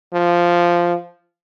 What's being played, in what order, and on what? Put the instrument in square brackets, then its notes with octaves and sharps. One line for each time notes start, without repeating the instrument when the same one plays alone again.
[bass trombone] F3